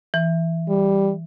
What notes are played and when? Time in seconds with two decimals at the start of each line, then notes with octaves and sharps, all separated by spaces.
0.14 E3
0.68 G3